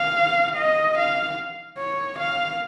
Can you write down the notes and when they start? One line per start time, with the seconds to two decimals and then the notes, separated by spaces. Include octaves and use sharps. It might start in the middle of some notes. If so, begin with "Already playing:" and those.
Already playing: F5
0.56 D#5
0.98 F5
1.78 C#5
2.19 F5